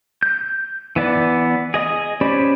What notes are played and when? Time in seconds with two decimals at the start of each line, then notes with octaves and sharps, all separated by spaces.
0.23 G6
0.96 E3 B3 D5
1.74 G#4 D#5 D#6
2.21 C#4 G4 C5 D5 B5